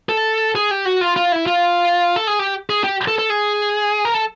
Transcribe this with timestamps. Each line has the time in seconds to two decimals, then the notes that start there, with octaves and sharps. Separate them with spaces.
0.09 A4
0.55 G#4
0.71 G4
0.85 F#4
1.01 F4
1.16 F4
1.32 E4
1.46 F4
2.16 A4
2.27 G#4
2.39 G4
2.70 G#4
2.84 G4
3.08 A4
3.19 A4
3.30 G#4
4.05 A#4
4.14 A4